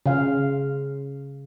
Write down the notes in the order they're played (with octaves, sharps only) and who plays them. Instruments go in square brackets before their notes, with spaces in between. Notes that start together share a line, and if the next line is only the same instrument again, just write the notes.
[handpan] C#3 F5